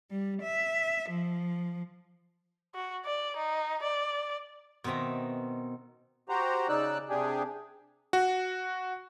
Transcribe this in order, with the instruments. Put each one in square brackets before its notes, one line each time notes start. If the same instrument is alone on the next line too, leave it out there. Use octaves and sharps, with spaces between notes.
[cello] G3
E5
F3
[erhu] F#4
D5
D#4
D5
[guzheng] B2 D#3 C4 E5 A#5
[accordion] F#4 G4 C5 A#5
C#3 D#4 D5 E6 F#6
C3 D4 G4 G#4
[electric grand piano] F#4